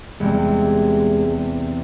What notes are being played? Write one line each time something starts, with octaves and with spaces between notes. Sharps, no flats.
E2 C3 G3 G#3